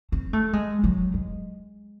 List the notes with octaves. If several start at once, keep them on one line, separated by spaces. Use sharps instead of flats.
C4
A3
G#3
F#3
G#3